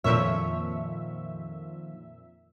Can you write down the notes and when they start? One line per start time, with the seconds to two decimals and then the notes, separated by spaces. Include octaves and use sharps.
0.04 F2 A#2 D#3 F3 C#5 E5